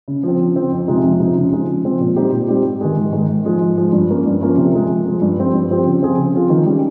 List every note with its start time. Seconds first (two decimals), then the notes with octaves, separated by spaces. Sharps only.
0.08 C#3
0.23 F3 C4
0.40 C#3
0.56 F3 C4
0.72 F2
0.88 C3 F3 G#3 D#4
1.04 F2
1.20 C3 F3 G#3 D#4
1.36 C#3
1.53 F3 G#3 C4
1.68 C#3
1.84 F3 G#3 C4
2.00 A#2
2.16 G3 C4 D#4 G4
2.32 A#2
2.48 G3 C4 D#4 G4
2.65 G#2
2.81 D#3 G#3
2.97 G#2
3.13 D#3 G#3
3.29 G#2
3.45 F3 G#3
3.61 G#2
3.77 F3 G#3
3.93 G2
4.09 F3 A#3 C#4
4.26 G2
4.41 F3 A#3 C#4
4.57 C3
4.74 F3 G#3
4.89 C3
5.06 F3 G#3
5.21 G2
5.37 F3 C4 G4
5.54 G2
5.70 F3 C4 G4
5.86 C#3
6.02 F3 C4 F4 G#4
6.18 C#3
6.34 F3 C4 F4 G#4
6.50 D#3
6.66 G3 C#4 G4